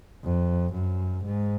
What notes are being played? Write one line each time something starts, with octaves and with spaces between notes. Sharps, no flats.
F2
F#2
G#2